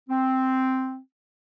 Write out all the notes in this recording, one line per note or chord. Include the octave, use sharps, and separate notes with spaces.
C4